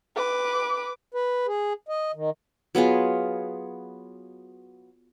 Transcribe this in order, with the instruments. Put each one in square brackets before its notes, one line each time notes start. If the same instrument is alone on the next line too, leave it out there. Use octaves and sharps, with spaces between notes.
[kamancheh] B4 D6
[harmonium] B4
G#4
D#5
D#3
[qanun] F#3 B3 F4 G#4